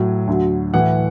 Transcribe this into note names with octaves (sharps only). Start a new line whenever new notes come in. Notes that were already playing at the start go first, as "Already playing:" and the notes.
Already playing: A2 F#3
D2 D3 F#3
A2 E3 F#5